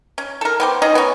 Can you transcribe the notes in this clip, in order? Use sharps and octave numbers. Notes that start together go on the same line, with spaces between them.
C#4
A4 A#4
B3 G4 C5
C#4 D#4 G#4 D#5
B3 C#4